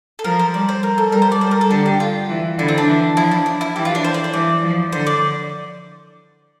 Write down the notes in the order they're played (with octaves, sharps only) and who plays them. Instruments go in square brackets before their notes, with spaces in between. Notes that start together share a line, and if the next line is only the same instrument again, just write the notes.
[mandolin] A4
[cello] F3 [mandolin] A#4
[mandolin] C5
[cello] G3 [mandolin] D5
[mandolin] C5
A#4
A4
[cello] G3 [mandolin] A#4
[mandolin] C5
D5
[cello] G3 [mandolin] C5
[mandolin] A#4
A4
[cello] D3 [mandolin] G4
[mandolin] G4
F4
[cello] E3
[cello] D3 [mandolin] E4
[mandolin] C4
D4
[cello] E3
[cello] F3 [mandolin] E4
[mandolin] D4
D4
E4
[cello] E3 [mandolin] G4
[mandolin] F4
D4
C5
D5
C5
[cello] E3 [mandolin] D5
[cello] F3
[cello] D3 [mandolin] C5
[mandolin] D5